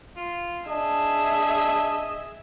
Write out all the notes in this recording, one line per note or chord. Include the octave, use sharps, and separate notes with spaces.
F4
D4 G#4 D#5 E5